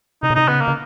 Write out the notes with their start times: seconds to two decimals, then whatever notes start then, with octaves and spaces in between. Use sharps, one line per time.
0.23 C3 D#4
0.30 B2
0.35 C3 D#4
0.48 C#3 B3
0.61 A#3
0.68 C#3